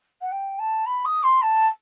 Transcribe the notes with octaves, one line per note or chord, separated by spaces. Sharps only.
F#5
G5
A5
B5
D#6
C6
A5